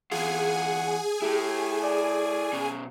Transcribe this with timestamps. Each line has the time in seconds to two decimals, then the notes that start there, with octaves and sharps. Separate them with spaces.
0.11 E2 F4 G#4 F#5 G#5
1.22 E4 G4 A4
1.83 D5
2.53 B2 C#4